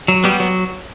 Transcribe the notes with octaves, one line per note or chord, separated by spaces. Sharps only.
F#3
G3 B3 G4
F#3